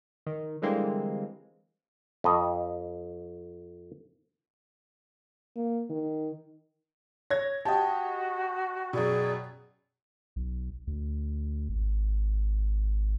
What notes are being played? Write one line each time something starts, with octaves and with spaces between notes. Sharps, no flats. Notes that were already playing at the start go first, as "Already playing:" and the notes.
D#3
D3 E3 G3 G#3 A#3 C4
F2 D#5
A#3
D#3
C#5 G#6 A#6
F#4 G4 D#5 G5 A5
F#2 B2 G#4 D5 E6
B1
D2
G#1